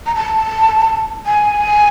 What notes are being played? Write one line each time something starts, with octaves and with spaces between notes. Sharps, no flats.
A#5
A5
G#5